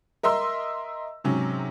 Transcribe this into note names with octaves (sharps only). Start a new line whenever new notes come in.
A#4 D#5 E5 C6 E6
G#2 C3 F#3 C#4